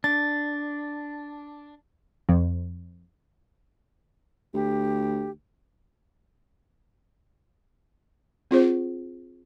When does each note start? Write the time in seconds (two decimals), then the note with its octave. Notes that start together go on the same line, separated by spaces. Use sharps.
0.04 D4 A6
2.29 F2
4.54 D2 G4
8.51 C4 F4 G#4 C5